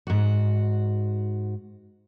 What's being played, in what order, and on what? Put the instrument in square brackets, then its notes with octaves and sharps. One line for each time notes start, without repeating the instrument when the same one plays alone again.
[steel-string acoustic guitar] G#2 F#4